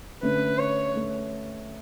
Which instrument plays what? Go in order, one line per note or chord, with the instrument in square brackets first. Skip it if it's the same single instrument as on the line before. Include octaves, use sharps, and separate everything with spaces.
[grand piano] D3 A3 C#4 [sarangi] B4
[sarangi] C#5
[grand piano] A3